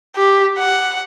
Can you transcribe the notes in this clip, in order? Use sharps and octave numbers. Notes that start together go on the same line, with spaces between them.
G4
F#5